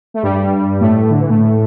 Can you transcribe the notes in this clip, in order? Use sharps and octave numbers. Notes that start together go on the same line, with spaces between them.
A3
G2 G3
A2 A3
D3
E3
A2 A3